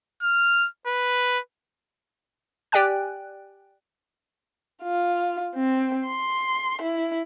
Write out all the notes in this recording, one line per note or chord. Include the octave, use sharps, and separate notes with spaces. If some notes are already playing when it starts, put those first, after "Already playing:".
F6
B4
G4 D5 G5 G#5 F#6
F4
C4
C6
E4